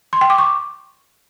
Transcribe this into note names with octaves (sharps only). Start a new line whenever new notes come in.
C6
G5
D6
C#6